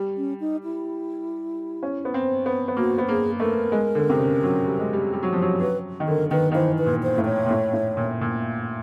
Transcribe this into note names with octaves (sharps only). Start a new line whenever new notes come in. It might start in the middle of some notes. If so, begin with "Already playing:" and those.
Already playing: G3
C#4
D#4
E4
C#4
B3
C4
B3
B3
A#3 F#4
B3
A#3 G#4
A3 A#4
G#3
D3
C3
C#3
F#3
G3
G#3
G3
G3
F#3
F3
F#3
F#3 B4
D#3
D3 A#4
D#3 B4
D#3
E3 C5
B4
A#2
C5
A2
C#5
A#2
A2
A2
A#2
A#2